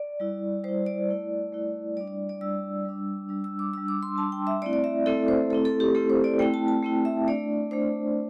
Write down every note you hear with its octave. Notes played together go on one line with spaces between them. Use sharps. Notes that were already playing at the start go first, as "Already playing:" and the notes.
Already playing: D5
G3 E4
G3 E4 C5
D5
A3 E4
A3 E4
G3 D4 D5
D5
D5
G3 D4 E6
G3 D4
G3 D4
E6
D6
G3 D4 E6
D6
C6
G3 D4 A5
G5
E5
A3 C4 E4 D5
D5
E5
A3 C4 E4 A4
C5
A3 C4 E4 A4
A4
G4
A3 C4 E4 A4
C5
D5
A3 C4 E4 G5
A5
A5
A3 C4 E4
E5
A3 D4 D5
A3 D4 C5